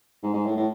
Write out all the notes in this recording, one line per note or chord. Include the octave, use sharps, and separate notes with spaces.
G#2
G#2
A2
A2